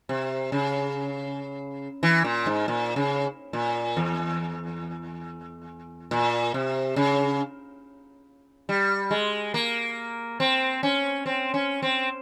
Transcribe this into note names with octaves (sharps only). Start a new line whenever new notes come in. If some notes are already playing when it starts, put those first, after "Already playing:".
C3
C#3
E3
A#2
G#2
A#2
C#3
A#2
E2
A#2
C3
C#3
G3
G#3
A#3
C4
C#4
C4
C#4
C4